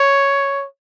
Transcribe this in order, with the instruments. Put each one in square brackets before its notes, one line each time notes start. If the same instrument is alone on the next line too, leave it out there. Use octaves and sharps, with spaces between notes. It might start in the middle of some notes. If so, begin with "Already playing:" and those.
Already playing: [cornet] C#5